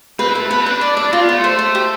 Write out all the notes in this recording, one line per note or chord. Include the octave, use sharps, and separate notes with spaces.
C4 B4
E4
A3 B4
B3 B4
C4
D4 B4
D5
E4 D5
D4
C4 F4
B3
A3 C6
C5
C5
G4